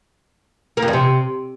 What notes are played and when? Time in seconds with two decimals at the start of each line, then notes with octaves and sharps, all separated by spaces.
0.77 A#3
0.83 F2
0.88 E2
0.93 C3